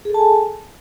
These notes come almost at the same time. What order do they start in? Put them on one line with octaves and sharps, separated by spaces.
G#4 A4 A5 G#5